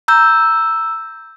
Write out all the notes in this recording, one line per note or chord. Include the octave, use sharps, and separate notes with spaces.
A#5 E6 G6